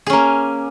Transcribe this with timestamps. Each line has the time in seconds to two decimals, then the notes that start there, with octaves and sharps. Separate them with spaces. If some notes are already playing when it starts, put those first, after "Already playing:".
0.07 G#4
0.10 C#4
0.13 A#3